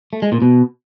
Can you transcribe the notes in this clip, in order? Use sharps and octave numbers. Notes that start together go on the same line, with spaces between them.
A3
G#3
A#2
B2